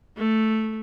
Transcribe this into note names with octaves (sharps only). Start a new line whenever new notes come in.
A3